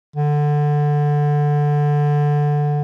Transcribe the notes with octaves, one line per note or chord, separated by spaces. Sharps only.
D3